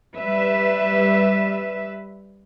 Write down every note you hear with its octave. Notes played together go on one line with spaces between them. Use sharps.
G3 B4 E5